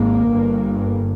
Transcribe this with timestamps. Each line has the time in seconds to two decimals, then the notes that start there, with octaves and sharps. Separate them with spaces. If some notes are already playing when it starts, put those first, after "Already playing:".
Already playing: G#1 G#2 A#3
0.28 G1 G2